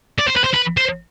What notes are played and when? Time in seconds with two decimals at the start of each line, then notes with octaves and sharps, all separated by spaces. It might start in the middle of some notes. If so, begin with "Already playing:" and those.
0.19 D5
0.28 C5
0.36 B4
0.44 C5
0.54 B4
0.77 C5